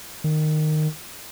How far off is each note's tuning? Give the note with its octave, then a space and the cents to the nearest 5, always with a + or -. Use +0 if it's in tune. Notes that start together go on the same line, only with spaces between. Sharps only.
D#3 -15